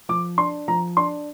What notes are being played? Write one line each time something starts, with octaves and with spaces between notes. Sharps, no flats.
F3 D6
D4 C6
F3 A#5
D4 C6